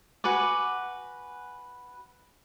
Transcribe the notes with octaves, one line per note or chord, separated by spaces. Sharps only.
F#4 B4 G#5 D6